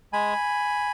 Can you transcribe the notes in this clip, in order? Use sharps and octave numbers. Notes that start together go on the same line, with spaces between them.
G#3 G#5 B5